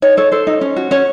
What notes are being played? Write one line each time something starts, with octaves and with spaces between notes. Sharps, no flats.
D#4 C#5
A4 C#5
A4 C5
D#4
C#4
F#4
C#4 C#5